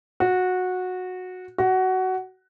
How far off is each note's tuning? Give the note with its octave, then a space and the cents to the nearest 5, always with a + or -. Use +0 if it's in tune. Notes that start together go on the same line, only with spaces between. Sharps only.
F#4 -15
F#4 +15